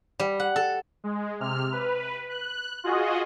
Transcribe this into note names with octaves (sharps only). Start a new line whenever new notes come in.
G3
F#5
A4
G#3
C3 F6
B4
F#6
F4 F#4 G#4 D#5